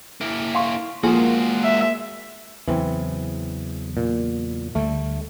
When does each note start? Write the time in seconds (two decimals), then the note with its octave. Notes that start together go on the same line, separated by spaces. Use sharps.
0.21 A#3 E4
0.55 F5 C6 C#6
1.03 F3 G#3 A#3 F#4 G#4
1.64 E5
2.68 E2 C#3 E3 F#3 C4
3.97 A#2
4.75 D2 D3 G3 A3